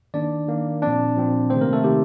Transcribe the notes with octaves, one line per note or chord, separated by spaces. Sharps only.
D#3 A#3 D4 D5
D#3 A#3
A#2 F3 C4 D4 D5
A#2 F3 C4
C3 D#3 A3 C4 C5
A#3 A#4
A3 A4
C3 D#3 A3 C4 G4